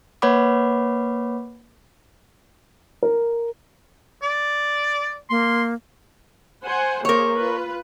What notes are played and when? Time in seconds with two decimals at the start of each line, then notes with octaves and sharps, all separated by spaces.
0.22 A#3 B4 C#5 F#5 B5 D6
3.03 A#4
4.22 D5
5.30 A#3 C6
6.63 C5 F#5 G#5
7.05 A#3 G#4 A#4 C5 C#5
7.36 F4 B4